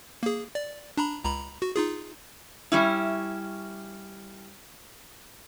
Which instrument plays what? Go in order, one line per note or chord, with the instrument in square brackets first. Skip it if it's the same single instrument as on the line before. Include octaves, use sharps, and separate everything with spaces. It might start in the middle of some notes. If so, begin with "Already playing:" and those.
[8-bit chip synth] A#3 G#4
D5
D4 A#5 B5
C#2 A#5 B5
F#4
D#4 F4 G#4
[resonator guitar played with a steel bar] G3 C#4 E4